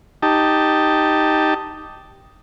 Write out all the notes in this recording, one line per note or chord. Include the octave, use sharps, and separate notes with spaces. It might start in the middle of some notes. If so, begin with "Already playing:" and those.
D#4 G4 A5